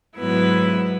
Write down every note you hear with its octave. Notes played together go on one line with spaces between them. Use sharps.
G#2 F#3 B3 E4 B4